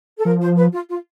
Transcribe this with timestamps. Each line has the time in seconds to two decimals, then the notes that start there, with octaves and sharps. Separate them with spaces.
0.18 A4
0.25 F3 A#4
0.41 C5
0.57 B4
0.73 F4
0.89 F4